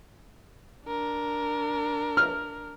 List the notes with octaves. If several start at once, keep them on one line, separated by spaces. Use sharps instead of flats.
D4 A#4
F6